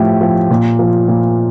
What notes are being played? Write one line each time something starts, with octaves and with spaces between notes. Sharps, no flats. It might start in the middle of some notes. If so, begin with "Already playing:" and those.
Already playing: A2 F3 G4
F3
A#2
F3
A#2